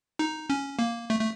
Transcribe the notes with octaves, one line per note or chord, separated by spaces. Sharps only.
D#4
C#4
A#3
A3
A3